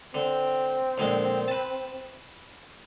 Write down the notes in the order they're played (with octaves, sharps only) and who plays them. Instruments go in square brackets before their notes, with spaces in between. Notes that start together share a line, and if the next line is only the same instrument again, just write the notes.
[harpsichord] D3 [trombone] C4
[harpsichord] A#1 D3 G#3
B4 A5